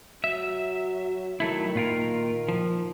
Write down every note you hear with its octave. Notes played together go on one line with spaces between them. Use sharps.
F#3 E5
D#3 F#3 A3 E4
A#2 F4 A#4
F3